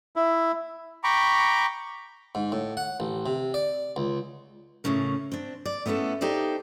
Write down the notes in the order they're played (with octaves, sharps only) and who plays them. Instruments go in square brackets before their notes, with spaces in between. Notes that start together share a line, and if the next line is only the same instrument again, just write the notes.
[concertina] E4
[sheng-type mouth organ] G5 A#5 B5 C#6 D6
[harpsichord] G#2
A2
F#5
A1
C3
D5
C#2
[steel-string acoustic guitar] A2 C#3 C#4 A#4
C4 D4
D5
A3 B3 C#4 E4 A4
D#4 G4 A4 C5 D5